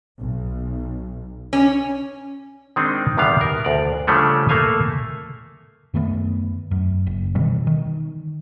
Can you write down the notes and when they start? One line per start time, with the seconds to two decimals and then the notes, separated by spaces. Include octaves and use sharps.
0.18 B1
1.53 C#4
2.76 D#3 G#3 C4 D4 D#4
3.17 E2 D#3 G3 B3 F5
3.41 A#4
3.65 D2 D5
4.07 C#3 F3 G3 A3 C#4 D4
4.49 A3 A#3 A4 F5 G#5
5.94 F#2 D#3 A3 B3
6.71 F#2
7.07 F#1
7.35 B2 D#3 E3 G3
7.67 D#3